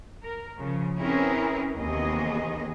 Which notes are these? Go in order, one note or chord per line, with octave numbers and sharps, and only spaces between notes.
A#4
C#3 F3
C4 C#4 E4 G#4 A#4 B4
D#2 C3 E3 B3 G#4 D#5